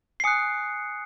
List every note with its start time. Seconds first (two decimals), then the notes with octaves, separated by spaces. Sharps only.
0.20 C7
0.24 G#5 D#6 F#6 C#7